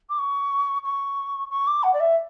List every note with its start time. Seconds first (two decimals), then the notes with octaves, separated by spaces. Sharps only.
0.09 D6
0.18 C#6
0.84 C#6
1.50 C#6
1.67 D6
1.83 F#5
1.93 D5
2.00 E5